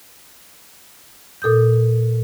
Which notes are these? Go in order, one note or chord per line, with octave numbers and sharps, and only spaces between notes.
A#2 A4 D#6 G6